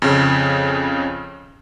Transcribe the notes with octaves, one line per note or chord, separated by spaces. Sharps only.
F2 C#3